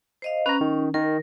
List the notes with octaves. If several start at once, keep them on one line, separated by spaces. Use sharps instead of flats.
C5 D#5 F5
C#4 B4 A#5
D#3
D#3 A#4